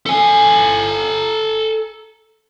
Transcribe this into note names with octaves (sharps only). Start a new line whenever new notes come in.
A4 G#5